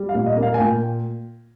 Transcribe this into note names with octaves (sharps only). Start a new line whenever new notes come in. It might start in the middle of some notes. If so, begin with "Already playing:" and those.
Already playing: G3
F5
A#2
D#5
A#3
F5
G#5
A#2 G5